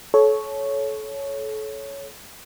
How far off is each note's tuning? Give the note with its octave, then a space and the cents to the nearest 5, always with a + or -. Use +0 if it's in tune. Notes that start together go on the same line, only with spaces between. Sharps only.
A4 -30 C#5 +0